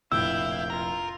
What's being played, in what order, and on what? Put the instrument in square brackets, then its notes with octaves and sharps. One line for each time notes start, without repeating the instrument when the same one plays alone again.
[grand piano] F1 A#1 A2 [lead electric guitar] E4 [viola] F5 G5 [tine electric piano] E6
[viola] F4 [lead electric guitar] A#4